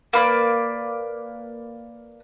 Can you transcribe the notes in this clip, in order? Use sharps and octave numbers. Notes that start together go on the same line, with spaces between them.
A#3 B4 D5